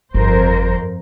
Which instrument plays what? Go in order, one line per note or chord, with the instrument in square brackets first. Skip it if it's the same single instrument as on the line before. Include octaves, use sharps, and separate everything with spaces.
[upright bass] G1 [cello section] F2 A#4 C5